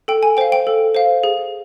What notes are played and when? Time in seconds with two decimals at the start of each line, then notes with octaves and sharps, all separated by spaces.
0.08 A4 G5
0.23 G#5
0.37 C5 F5 G5
0.52 G5
0.67 A4
0.95 C5 F5
1.24 G#4